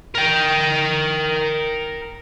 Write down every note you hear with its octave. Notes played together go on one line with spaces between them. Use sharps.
A#4 G5